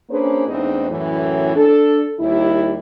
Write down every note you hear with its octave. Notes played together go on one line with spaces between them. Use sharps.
A#3 C#4 D4 G#4 B4 C5
E2 G#2 A3 C4 D4 D#4
F#2 A2 E3
D4 A4
D#2 G3 E4